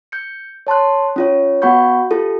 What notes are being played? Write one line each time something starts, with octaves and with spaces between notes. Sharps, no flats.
G6 C#7
C#5 A5 C6 F#6
C#4 F4 C#5
B3 F#4 F#5 B5 C#6 G6
F4 G4 A4